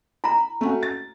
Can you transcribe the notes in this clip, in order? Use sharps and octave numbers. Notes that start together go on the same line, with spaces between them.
E4 A#5 B5
A3 C#4 F#4
A6